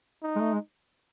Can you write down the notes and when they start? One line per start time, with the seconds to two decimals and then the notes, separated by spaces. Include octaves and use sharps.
0.23 D#4
0.36 G#3
0.40 A3
0.53 G#3